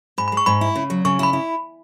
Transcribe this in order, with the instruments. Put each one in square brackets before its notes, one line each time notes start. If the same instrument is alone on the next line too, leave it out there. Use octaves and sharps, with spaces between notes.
[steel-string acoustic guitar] G#2 [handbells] B5
[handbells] B5
[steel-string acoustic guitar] G#3
[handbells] C#6
[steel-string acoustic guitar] G#2 [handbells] B5
[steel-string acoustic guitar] E4
C#3
F#3
[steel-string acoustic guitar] C#3 [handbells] C#6
[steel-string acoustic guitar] E4 [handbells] B5
[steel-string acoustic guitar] E4